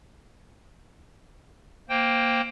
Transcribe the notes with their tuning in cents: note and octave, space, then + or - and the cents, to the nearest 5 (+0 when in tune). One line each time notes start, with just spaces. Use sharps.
A#3 +0 C5 +0 G5 +5